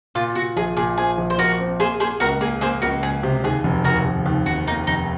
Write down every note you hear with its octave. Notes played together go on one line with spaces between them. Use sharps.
A#2 F4
A#2 F#4
A#1 G#4
A#2 G#4
F3 G#4
A#1
C5
A#1 F#4 A#4
C4
A#3 G#4 C5
A#3 G#4 C5
C#2 F#4 A#4
A#3 G#4
A#3 G#4 C5
C#2 F#4 A#4
C#2 G#4
C3
D#2 G#4
F1
D#2 F#4 A#4
F1
D#2
F1 F#4
A#3 D#4
F1 D#4